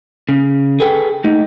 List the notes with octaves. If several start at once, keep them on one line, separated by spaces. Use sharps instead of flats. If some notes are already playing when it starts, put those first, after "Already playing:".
C#3
G#4 A4 B4 G5
A3 D#4